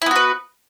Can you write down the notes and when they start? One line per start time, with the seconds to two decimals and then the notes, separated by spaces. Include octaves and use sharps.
0.02 E4
0.06 B3
0.11 F#4
0.16 B4